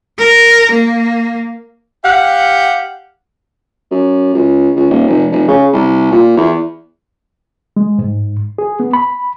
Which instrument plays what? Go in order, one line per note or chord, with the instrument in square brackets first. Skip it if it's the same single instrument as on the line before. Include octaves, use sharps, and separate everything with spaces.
[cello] A#4
A#3
[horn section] G4 F5 F#5
[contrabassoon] F#2
C#2
C#2
D#1
F1
F1
C#3
C2
A#2
E2
[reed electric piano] G#3
G#2
G#4
B3
B5